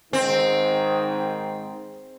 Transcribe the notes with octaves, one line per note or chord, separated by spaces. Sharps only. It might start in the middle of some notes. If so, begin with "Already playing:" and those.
G#2 D#3 C4